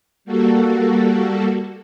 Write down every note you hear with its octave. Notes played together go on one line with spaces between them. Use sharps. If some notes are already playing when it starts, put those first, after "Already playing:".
G3 A#3 F#4 A4